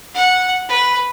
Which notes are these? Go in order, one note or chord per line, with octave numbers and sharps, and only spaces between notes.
F#5
B4